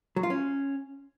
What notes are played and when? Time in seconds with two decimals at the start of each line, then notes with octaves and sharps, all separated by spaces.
0.16 F#3
0.23 F4
0.30 C#4